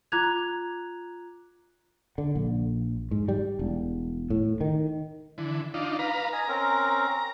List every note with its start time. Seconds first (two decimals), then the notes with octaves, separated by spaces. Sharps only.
0.12 F4 A#5 D6 F#6 G#6 F7
2.18 D3
2.35 A#1
3.11 G#2
3.28 G3
3.59 E1
4.30 A2
4.61 D#3
5.38 D3 E3
5.74 D4 D#4 F4
5.99 B4 F5 A#5
6.33 D#5 G#5 A#5
6.48 C4 C#4 A#4